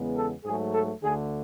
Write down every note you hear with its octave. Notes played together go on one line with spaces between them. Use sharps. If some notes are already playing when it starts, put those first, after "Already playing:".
Already playing: E2 C#3 G#3 B3
A4
G#2 F#3 A3 G#4
A4
D2 D3 A3 G#4